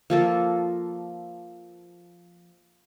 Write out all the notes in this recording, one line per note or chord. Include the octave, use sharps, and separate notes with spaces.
F3 A#3 A4